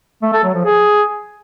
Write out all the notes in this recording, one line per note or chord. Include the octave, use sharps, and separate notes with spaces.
A3
A4
F#3
F3
G#4